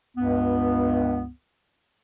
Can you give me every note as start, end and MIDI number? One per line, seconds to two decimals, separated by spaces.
0.16 1.28 37
0.16 1.28 43
0.16 1.28 59